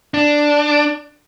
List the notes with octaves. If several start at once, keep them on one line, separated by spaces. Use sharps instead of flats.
D4